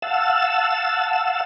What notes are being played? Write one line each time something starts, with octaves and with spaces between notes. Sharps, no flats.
F5 F#5 A5 E6